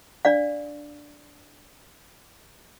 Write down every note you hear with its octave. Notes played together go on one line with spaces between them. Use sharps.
D4 D5 F5